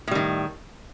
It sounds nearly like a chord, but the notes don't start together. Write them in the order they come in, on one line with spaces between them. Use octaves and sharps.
A2 G3 D#3